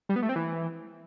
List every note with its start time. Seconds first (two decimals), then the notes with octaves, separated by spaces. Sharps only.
0.09 G3
0.16 B3
0.22 A3
0.29 C4
0.36 E3